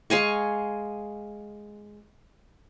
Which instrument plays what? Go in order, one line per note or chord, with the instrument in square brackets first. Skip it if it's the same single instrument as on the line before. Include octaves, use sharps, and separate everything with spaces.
[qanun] G#3 F5 G#5 C#6